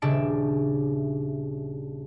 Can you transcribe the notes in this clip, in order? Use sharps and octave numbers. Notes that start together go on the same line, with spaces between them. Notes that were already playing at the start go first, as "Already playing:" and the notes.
D#1 C#3 D4 E5 A5 D7